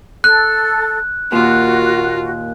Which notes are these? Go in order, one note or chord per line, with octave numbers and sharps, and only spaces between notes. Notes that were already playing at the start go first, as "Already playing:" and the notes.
A4 F#6
D#2 A#2 F4 F#4